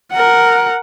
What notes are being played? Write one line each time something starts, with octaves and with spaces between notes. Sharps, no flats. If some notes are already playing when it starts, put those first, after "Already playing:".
A#4 F#5